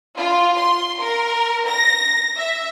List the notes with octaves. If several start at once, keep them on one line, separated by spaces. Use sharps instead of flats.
F4
C6
A#4
A#6
E5